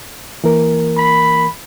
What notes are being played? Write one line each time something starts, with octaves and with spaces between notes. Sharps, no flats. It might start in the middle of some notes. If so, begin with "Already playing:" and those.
E3 A#3 A#4
B5